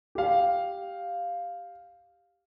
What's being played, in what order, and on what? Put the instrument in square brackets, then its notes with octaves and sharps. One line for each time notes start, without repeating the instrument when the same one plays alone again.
[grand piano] G4 F5